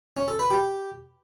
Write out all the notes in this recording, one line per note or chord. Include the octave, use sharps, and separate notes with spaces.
C#4
A4
B4
G4